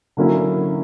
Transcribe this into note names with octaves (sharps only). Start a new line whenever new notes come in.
D3 F#3 A#3 C#4 E4